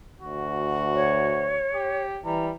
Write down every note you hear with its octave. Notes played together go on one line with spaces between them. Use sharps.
D2 F#4
C#5
G4
E3 G3 A#5